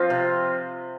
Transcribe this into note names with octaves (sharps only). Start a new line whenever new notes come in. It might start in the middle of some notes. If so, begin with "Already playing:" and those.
Already playing: F3 C4 F4
C3